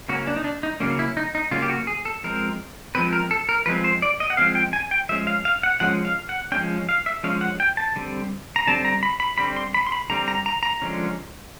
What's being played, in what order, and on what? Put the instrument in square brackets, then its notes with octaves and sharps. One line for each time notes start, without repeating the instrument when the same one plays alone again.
[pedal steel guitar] C#3 F#3 A#3 C#4 F#4
D4
D#4
D4
D#4
C#3 F#3 A#3 C#4
E4
D#4
D#4
C#3 F#3 A#3 C#4 F4
G4
F#4
G#4
A4
F3 G#3 C4 A#4
F3 G#3 C4 B4
A#4
A4
A#4
F3 G#3 C4 B4
C5
D5
D#5
F#5
F3 G#3 C4 F5
G5
G#5
G5
F3 G#3 C#4 E5
F5
F5
F#5
F3 G#3 C#4 F#5
F5
F#5
F3 G#3 C#4 G5
F5
E5
F3 G#3 C#4 F5
F#5
G5
A5
D3 G3 C4
A#5
D3 G3 C4 A5
A#5
B5
B5
D3 G3 C4 B5
C6
B5
C6
B5
D3 G3 C4 A#5
A#5
A#5
A#5
D3 F3 G#3 C#4